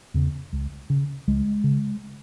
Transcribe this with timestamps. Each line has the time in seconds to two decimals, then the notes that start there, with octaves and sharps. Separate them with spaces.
0.14 E2 C#3
0.53 C#2
0.90 C#3
1.28 C#2 G#3
1.64 C#3